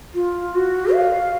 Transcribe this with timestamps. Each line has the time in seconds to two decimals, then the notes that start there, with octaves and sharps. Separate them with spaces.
0.14 F4
0.54 F#4
0.93 F5